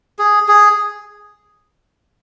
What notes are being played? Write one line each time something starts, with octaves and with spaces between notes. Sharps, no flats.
G#4
G#4